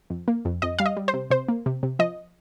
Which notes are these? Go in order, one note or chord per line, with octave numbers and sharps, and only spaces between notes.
F2
A#3
F2
F2 D#5
G3 F5
D#5
G3
C5
C3
C3 C5
A#3
C3
C3
F3 D#5